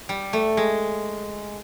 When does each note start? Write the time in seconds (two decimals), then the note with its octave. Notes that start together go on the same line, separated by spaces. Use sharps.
0.09 G3
0.33 A3
0.57 G#3